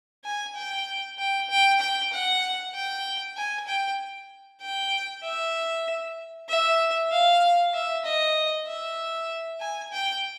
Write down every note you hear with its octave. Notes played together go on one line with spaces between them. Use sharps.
G#5
G5
G5
G5
G5
F#5
G5
G#5
G5
G5
E5
E5
F5
E5
D#5
E5
G#5
G5